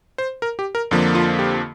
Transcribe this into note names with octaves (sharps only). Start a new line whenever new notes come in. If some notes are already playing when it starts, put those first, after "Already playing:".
C5
A#4
G4
A#4
F2 D3 F3 A#3
F4
G4